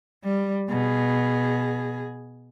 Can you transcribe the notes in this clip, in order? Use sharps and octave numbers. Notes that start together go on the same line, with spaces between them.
G3
B2 G#4